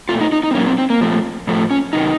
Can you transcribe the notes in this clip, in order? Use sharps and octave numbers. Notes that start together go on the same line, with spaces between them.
A#2 A3 F4
D#4
D#4
D#4
C4
A#2 F#3 A#3 C#4
C4
C4
A#3
A#2 F3 A3
A2 F3 A3
C#4
C3 D#3 F#3 D#4